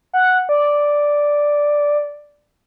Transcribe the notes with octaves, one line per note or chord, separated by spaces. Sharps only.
F#5
D5